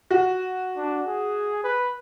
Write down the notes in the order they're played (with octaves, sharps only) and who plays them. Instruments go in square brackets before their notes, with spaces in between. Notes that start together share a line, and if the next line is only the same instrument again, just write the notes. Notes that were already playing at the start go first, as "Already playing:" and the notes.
[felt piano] F#4
[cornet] D4
G#4
B4